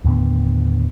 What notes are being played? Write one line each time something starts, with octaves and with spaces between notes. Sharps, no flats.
D#2 A2 D3 B3